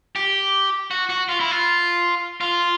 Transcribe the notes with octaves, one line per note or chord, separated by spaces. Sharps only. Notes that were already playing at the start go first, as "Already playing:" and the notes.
G4
F#4
F#4
F4
E4
F4
F4